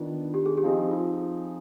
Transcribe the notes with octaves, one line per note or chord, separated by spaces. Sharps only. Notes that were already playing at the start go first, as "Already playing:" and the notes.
Already playing: D#3 B3 D4 F4
G4
G#4
G4
F3 C4 D#4 G#4
F4